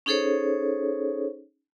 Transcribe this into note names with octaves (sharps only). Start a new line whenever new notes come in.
C#4 D#4 G#4 A4 C5 C#5